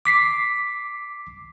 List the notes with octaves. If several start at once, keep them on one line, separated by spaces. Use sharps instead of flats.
D6 B6 C7